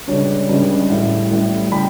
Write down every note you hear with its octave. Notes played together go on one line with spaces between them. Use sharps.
C#2 C#3 G3 D4 C#5
C#2 C#3 G3 D4
A1 A2 G3
A1 A2 G3
C#3 G3 G5 B5